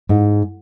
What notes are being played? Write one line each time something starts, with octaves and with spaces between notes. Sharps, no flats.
G#2